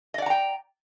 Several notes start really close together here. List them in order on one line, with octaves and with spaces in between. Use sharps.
D#5 D5 F#5 A#5 G5